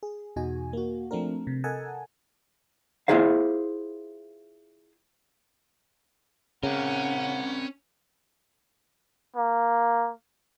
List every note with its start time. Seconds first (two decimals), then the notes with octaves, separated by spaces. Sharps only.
0.03 G#4
0.36 E2 B2 D#4 F#4 G#5
0.73 A#3 F#4
1.11 F3 A3 C4 D4 A#4
1.47 C3
1.64 A4 A#4 D#5 F#5 G#5 A5
3.08 E4 F4 G#4 C5 F5
6.63 C#3 C4 C#4 A#4 F#5
9.36 A#3